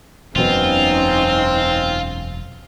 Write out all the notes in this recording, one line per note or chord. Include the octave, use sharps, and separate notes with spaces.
E1 F#2 B2 C4 C#4 D#4 F4